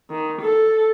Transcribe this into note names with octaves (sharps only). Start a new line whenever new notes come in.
D#3
A4